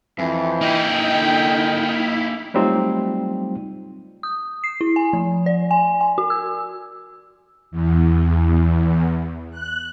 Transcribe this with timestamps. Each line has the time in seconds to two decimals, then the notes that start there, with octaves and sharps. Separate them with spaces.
0.19 F2 E3
0.61 A#3 D#4 E4 G#4 G5
1.14 D3
2.54 F#3 G3 A3 C4 D#4 F4
4.23 D#6
4.64 C7
4.81 E4
4.96 G#5
5.13 F3
5.46 D5
5.71 G#5
6.01 G#5
6.18 F#4
6.30 E6
7.71 E2
9.51 F#6